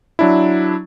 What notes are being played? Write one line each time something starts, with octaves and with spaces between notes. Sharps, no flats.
F#3 D4 E4